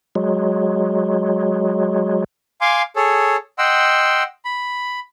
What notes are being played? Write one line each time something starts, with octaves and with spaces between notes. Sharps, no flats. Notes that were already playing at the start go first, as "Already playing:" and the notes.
F#3 G#3
F5 G#5 C6 D6
G#4 A4 C#5
D#5 F#5 G5 C6 E6
B5